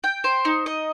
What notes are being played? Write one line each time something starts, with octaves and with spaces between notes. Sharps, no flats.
G5
C5
D#4
D#5